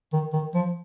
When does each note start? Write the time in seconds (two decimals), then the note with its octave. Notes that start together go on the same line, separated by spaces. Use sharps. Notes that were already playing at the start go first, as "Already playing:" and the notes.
0.13 D#3
0.33 D#3
0.55 F3